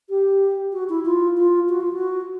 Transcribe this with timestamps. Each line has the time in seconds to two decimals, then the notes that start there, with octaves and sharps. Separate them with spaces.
0.09 G4
0.73 F#4
0.89 E4
1.05 F4
1.37 F4
1.69 F#4
1.81 F4
1.93 F#4